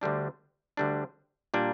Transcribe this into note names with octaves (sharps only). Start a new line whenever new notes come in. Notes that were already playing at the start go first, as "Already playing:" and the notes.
D2 D3 G3 D4
D2 D3 G3 D4
A#2 G3 A#3 D4